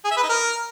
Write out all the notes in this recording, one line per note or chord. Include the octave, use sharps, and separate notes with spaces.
G#4
E5
B4
D#4
A#4